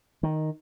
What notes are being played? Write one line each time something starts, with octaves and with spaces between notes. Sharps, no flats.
D#3